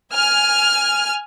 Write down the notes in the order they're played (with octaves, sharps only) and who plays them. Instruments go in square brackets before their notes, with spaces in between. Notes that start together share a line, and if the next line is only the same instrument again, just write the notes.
[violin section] G#5 F6